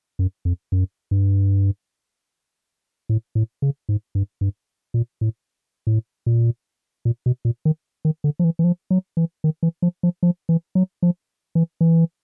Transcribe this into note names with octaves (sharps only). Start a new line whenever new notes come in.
F#2
F2
F#2
G2
A2
A2
C#3
G#2
G2
G2
A#2
A2
A2
A#2
A#2
B2
A#2
D#3
D#3
D3
F3
E3
E3
F3
F#3
E3
D#3
E3
F3
F3
F3
E3
F#3
F3
E3
E3